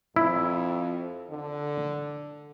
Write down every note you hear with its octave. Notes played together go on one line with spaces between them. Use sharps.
F2 E4
D3